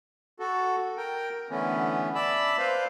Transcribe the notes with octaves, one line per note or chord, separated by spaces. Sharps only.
F#4 A4
A#4 G5
D3 E3 A3 B3 C#4
D5 E5 A5 B5 E6
B4 C5 F5